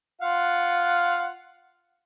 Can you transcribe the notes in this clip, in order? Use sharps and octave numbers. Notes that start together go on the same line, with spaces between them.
F4 F5 F#5